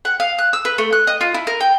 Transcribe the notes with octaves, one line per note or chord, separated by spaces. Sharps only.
F#5
F5
F#6
E6
B4
A3
F#6
D#5
F4
E4
A#4
G5